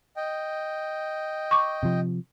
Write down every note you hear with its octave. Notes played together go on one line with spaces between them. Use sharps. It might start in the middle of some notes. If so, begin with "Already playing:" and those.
D#5 G5
C#6 D6
C3 F3